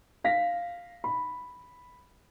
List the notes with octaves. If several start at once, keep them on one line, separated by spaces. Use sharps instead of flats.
F5 A#6 B6
B5